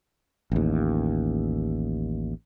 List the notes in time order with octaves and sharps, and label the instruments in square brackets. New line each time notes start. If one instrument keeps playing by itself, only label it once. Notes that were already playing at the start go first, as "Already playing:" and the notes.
[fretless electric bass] A1 D#2